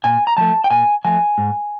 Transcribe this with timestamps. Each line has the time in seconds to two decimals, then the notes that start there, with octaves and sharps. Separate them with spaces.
0.04 A#2 G#5
0.27 A#5
0.37 F3 A3 A5
0.64 G5
0.70 A#2 G#5
1.05 F3 A3 G#5
1.38 G#2